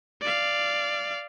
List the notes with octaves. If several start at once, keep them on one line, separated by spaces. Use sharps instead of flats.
D5 F5